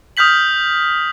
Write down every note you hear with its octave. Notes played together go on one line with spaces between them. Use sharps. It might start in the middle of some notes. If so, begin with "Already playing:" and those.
D#6 F6 G6 B6 F#7